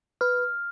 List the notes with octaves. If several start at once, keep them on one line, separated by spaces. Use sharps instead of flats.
B4 F6